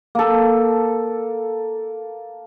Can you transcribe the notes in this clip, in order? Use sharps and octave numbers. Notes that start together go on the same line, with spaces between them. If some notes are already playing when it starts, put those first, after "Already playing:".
A#3 A4